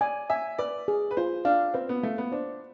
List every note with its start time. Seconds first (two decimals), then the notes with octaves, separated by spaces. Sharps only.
0.01 D5 G#5
0.30 E5 G#5
0.58 B4 D5
0.88 G#4
1.11 B4
1.17 F4 C5
1.45 D4 F5
1.74 C4 B4
1.89 B3
2.03 A3 F5
2.18 B3
2.32 D4 C5